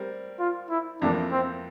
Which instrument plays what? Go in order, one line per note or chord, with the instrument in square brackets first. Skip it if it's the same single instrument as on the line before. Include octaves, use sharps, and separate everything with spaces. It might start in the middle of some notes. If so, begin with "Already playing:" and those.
Already playing: [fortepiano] G3 C4 A#4
[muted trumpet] F4
E4
[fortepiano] F2 C3 E3 A#3 [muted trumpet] D4
[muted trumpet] C4